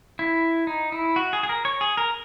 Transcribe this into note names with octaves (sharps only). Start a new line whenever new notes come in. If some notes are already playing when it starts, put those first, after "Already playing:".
E4
D#4
E4
F#4
G#4
G#4
A#4
C#5
G#4
A#4